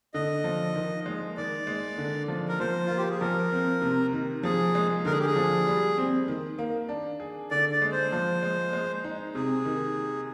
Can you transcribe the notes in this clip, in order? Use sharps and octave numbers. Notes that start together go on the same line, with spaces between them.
D3 D#5
F3
D#3
G#3
D#3 D5
G#3
D3
F3
A#4
F3 C5
A#3 F4
G4
G#4
F3 A#4
C4
C3
D#3
F3 G#4
G#3
D3 A#4
G#4
G4
G#4
F3
G3
C4
D#3
A#3
D4
G#4
D3 D5
D5
G#3
C5
F3
G#3
G#3
D#4
C3 G#4
D#3